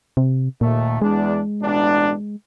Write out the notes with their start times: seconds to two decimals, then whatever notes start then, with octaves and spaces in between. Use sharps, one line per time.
0.17 C3
0.61 D#2 A#2 A3
1.02 E2 G#3 D4
1.61 A1 B2 D4